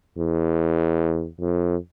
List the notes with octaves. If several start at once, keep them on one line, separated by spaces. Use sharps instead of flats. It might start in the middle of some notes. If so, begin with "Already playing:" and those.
E2
F2